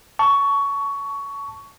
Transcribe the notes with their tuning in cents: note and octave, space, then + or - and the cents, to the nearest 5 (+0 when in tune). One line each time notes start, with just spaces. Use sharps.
A5 +0 C#6 +15